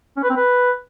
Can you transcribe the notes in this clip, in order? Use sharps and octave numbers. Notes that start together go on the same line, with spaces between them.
C#4
B4
C4
B4